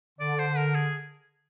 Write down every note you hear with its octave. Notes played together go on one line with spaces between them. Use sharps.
D3 D5
C5
A#4
G#4